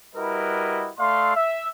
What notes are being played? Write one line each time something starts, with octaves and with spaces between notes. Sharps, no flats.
G3 E4 F#4 A#4 B4 D#5
A3 D5 E5 F5 C6
E5